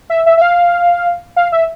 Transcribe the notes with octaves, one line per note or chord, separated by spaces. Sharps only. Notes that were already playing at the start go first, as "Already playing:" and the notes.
E5
E5
E5
F5
F5
E5